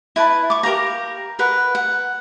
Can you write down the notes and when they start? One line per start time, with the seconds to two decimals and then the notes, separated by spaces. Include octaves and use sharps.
0.16 E4 B4 A5 B5
0.50 C#6 D6
0.63 G4 A#4 F5 A#5
1.39 A#4 B4 F#5
1.75 F#5